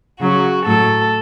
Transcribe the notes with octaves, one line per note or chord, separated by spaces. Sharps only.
C#3 F#3 F#4
A2 F#3 A4